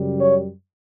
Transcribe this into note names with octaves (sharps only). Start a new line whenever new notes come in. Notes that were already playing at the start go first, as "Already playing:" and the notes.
Already playing: F#2 C#3 G3
C#5